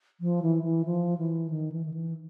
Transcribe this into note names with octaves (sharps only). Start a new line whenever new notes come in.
F3
E3
E3
F3
E3
D#3
E3
D#3
E3